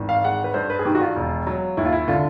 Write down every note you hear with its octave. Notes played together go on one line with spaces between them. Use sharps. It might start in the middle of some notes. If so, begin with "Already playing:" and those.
Already playing: G#1 E3
F5
G#3 F#5
B4
G2 C5
B4
G#4
D#3 G4
F#4
F4
E1
F#3
D#2 E4
F4
E4
D3 F4